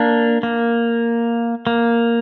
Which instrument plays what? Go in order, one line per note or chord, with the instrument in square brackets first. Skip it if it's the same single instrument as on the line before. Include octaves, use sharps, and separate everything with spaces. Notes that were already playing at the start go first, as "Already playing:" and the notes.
Already playing: [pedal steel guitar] A#3 D4
A#3
A#3